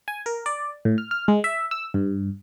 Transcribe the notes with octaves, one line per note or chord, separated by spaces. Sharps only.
G#5
A#4
D5
A2
F6
F6
G#3
E5
E6
G2